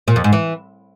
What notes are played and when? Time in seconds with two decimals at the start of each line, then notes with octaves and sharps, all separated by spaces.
0.08 A#2
0.16 F2
0.24 G#2
0.33 E3